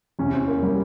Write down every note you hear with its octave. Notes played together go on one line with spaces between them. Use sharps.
E2 C3 E3 C#4
C4
A#3
G3